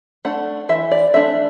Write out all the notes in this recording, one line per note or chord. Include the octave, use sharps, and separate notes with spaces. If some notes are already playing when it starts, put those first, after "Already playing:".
A3 D4 F#5
E3 E5
D5
A3 D4 E5